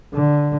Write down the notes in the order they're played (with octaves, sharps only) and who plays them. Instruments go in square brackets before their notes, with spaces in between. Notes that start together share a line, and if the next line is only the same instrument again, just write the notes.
[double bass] D3